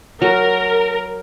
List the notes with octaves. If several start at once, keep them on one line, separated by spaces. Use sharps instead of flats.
F#3 A#4